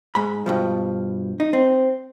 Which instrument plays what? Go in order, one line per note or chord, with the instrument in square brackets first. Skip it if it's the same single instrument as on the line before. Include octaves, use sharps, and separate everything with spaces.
[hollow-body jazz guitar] G#2 B5
G2 B2 F3
D#4
C4